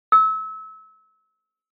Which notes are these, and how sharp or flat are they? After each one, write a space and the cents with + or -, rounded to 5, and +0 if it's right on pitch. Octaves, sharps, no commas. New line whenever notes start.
E6 -30